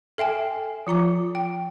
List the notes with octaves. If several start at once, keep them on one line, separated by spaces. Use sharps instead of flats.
A4 E5 G5 G#5
F3 F4 A#5 D6
G5